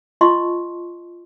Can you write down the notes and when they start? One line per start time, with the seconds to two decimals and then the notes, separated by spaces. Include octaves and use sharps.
0.21 F4 D#5 A5 C6 C#6